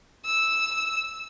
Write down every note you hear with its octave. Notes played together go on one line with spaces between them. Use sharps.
E6